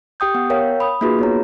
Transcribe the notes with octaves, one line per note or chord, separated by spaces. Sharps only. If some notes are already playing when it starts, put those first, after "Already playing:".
G4 G5 D#6 G6
B3 F#5
A#4 C#5 F5 G5
B5 D#6
A#3 D#4 F4 F#4 G#4 B4
B3 C#5 A#5